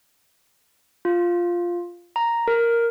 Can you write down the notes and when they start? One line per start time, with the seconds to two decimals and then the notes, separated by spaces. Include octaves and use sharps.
1.05 F4
2.16 A#5
2.48 A#4